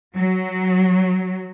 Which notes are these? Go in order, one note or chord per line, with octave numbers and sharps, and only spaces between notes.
F#3